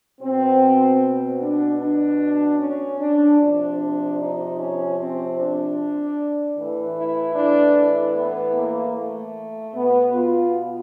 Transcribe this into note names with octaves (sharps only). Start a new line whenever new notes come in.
B2 C4
D4
D4
C#4
D4
C3 F3 D4
D#4
C#4
C4
D4
A2 E3
E4
D4
B3
A#3
A3
B2 B3
F4